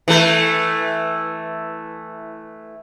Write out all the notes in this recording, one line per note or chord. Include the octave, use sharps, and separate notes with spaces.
E3 A3